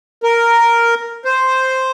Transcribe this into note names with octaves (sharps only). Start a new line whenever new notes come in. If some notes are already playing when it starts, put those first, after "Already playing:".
A#4
C5